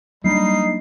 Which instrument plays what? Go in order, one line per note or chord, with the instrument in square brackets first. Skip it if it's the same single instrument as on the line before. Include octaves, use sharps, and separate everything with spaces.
[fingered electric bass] F#3 A#3 D4 [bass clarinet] G3 [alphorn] D#4 [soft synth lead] C7